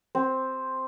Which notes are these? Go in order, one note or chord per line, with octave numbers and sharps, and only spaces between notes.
C4